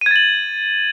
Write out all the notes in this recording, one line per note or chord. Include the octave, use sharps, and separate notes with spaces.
G#6 A6 D#7 F#7